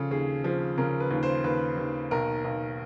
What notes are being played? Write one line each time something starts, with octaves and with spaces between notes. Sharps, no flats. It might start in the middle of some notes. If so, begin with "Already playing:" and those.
Already playing: C#3 F3 A4
D#2 G#4
F3
C#3 A#4
B4
D#2
C5
D#2 B4
D#2
B1 A#4
B1